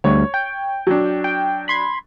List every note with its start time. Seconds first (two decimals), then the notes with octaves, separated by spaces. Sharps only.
0.04 D2 G3 C#5
0.34 G5
0.87 F#3 D4
1.24 G5
1.68 B5 C6 G#6